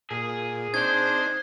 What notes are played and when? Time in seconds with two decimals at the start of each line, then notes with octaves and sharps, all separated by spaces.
0.10 A#2 G#4
0.74 C4 D4 D#4 C5 G#6